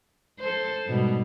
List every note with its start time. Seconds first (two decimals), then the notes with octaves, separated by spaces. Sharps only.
0.40 A4 C5
0.86 G#2 B2 G3